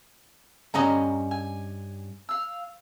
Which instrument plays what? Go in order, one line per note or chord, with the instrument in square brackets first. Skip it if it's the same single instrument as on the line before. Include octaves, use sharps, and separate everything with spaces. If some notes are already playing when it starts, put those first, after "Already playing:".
[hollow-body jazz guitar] G2 C#4 D#5 [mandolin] A#5
[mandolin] G#5
F5 E6